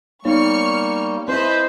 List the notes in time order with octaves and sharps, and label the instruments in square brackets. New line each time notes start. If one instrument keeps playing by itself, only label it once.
[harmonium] G3 A#3 [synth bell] B3 D#4 C#5 [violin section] C#6 F6 C#7
[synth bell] C4 E4 [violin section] B4 D#5 E5 [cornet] C5